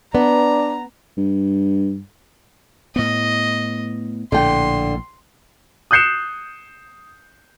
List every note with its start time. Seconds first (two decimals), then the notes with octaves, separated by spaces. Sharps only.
0.15 B3 D4 A#5
1.17 G2
2.96 A2 B3 D#5
4.32 A#1 A2 D3 G5 C6
5.91 D#6 F#6 G6 C7 C#7 E7